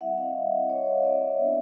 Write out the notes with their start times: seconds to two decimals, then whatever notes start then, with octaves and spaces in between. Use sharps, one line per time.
0.01 G3 C4 E4 E5 F#5
0.18 D#5 F5
0.69 C#5 D#5
1.04 D5 E5
1.39 B3 D4 F4